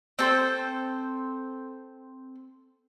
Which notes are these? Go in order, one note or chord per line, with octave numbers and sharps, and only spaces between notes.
C4 A4 C5